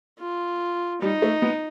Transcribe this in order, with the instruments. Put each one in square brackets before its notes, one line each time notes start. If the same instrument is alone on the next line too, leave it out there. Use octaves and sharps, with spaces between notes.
[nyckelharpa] F4
[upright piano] G3 [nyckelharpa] D#4
[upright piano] A3
B3